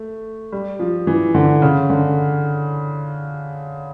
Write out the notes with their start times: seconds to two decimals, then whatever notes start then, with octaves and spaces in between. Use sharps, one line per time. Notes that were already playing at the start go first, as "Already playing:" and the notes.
Already playing: A3
0.52 G3
0.80 F3
1.07 E3
1.35 D3
1.62 C#3
1.90 D3